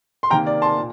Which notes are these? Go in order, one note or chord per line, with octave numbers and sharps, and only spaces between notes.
C6
C3 D#3 A#3 G5 A#5
D5
A5 C6
A#2